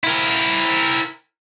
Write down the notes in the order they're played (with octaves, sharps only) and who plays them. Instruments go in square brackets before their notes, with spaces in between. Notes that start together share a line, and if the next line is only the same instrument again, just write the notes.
[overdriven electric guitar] E4 A#4